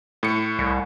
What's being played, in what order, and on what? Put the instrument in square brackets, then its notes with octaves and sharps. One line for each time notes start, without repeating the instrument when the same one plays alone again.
[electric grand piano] A2 C#7
[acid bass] C2